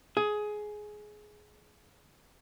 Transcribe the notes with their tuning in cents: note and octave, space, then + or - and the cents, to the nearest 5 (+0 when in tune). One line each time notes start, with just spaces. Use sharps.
G#4 +15